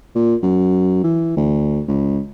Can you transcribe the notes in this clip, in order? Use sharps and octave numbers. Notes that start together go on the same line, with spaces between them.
A#2
F#2
E3
D2
C#2